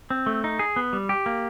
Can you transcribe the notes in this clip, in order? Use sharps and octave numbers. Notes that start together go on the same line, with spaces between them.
C4
A3
D#4
G#4
B3
G3
G4
A#3